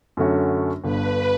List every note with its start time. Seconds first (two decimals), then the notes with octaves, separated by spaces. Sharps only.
0.17 F#2 D3 A3 C#4 F#4
0.83 G1 G2 D3 B4